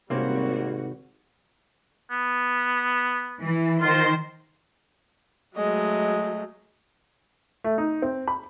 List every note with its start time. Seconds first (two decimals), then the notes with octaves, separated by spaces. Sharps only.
0.10 G#1 C3 G3 A#3 C4 C#4 F#4
2.11 B3
3.41 E3
3.82 D#3 F4 C5 C6
5.56 F#3 G#3 A3 D#5
7.64 A3
7.78 D#4
8.02 C4
8.28 B5